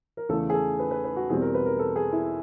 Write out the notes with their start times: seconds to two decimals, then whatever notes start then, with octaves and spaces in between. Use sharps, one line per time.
0.17 A#4
0.29 E2 C#3 E3 A3 A4
0.50 G#4
0.54 A4
0.79 B4
0.91 B4
1.04 B4
1.16 F#4
1.29 E2 B2 G3 C4 G#4
1.42 A#4
1.54 B4
1.66 A#4
1.79 A4
1.96 G#4
2.12 E4